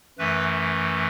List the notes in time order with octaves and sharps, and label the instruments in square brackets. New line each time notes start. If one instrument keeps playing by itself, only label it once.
[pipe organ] F#2 E3 A3 B4